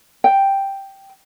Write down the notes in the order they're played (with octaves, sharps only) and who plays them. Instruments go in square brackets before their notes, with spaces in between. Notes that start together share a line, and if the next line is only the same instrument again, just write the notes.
[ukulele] G5